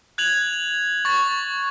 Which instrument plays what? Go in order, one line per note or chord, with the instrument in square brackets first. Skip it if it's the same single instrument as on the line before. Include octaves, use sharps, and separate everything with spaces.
[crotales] F#6 G#6 F7 F#7
C#6 A6